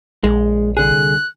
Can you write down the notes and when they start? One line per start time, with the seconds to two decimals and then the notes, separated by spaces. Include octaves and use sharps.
0.24 A#1 G#3
0.77 C2 D3 G#4 F#6